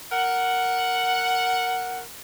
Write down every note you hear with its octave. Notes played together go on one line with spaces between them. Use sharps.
A#4 F#5